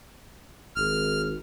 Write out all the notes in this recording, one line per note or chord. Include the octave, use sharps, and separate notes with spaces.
G#1 F6